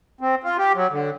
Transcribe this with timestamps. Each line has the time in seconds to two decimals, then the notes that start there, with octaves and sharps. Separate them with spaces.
0.21 C4
0.43 F4
0.58 G4
0.74 F#3
0.91 D3